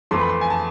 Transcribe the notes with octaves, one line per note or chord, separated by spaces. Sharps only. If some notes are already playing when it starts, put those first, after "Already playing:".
F2 E3 A3 C6
B5
C6
G#5
A5